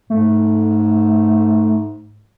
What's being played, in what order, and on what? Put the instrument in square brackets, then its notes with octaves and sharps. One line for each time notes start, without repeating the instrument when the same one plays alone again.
[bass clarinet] G#2 [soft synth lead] A3